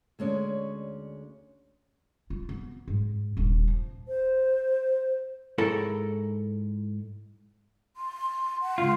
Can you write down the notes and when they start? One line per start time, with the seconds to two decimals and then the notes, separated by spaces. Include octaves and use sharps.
0.19 D2 G#3 C#4 C#5 D5
2.30 F4
2.49 B3
2.88 G#2
3.37 D#1 D4
3.68 F3
4.08 C5
5.58 G#2 E4 A4 A#4 C#5
7.97 C6
8.61 F#5
8.78 C#2 F4